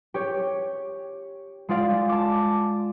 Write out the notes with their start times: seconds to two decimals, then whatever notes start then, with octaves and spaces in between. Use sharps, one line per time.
0.14 G4 C#5
1.69 G#3 F4 D5 F5
2.09 A5 D6